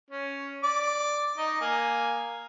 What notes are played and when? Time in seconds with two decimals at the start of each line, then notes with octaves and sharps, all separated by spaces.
0.11 C#4
0.63 D5 D6
1.38 D#4 D#5
1.61 A#3 G#5